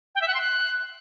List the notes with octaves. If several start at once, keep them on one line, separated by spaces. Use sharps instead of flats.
G5
E5
F#5
C6
F#6